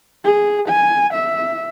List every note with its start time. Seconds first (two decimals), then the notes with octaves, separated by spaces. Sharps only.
0.25 G#4
0.69 G#5
1.14 E5